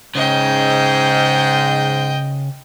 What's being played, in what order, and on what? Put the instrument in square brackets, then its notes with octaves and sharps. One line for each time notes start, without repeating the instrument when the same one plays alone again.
[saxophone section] G#2 [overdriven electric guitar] C#3 [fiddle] D#5 G5